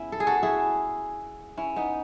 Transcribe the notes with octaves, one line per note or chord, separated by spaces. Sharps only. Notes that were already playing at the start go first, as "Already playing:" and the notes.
Already playing: C#3 B3 C#4 E4
A4
G#4
F#4 A4
E4 G#4
C#4 E4
B3 D#4